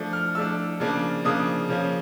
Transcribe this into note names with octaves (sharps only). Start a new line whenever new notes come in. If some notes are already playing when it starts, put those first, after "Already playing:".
Already playing: F3 A3 D4
F6
F3 A3 D4 E6
C#3 F3 A#3 D4
C#3 F3 A#3 D4 D#6
C#3 F3 A#3 C#4